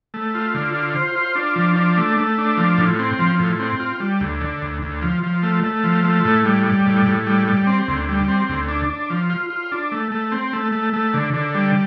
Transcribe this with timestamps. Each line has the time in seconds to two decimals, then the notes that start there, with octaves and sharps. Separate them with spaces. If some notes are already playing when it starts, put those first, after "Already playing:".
0.14 A3
0.34 F4
0.54 D3
0.74 F4
0.95 C5
1.15 F4
1.35 D4
1.56 F3
1.76 D4
1.97 A3
2.17 A3
2.38 D4
2.57 F3
2.78 A2
2.99 C4
3.19 F3
3.39 A2
3.59 C4
3.80 F4
4.00 G3
4.20 D2
4.41 D3
4.62 D2
4.82 D2
5.02 F3
5.23 F3
5.43 A3
5.64 A3
5.84 F3
6.04 A3
6.25 A2
6.45 G3
6.66 G3
6.86 A2
7.06 A2
7.27 G3
7.47 G3
7.67 C4
7.88 D2
8.09 G3
8.28 C4
8.49 D2
8.69 D4
8.90 D4
9.10 F3
9.30 F4
9.50 F4
9.72 D4
9.92 A3
10.12 A3
10.32 C4
10.53 A3
10.72 A3
10.94 A3
11.14 D3
11.34 D3
11.54 G3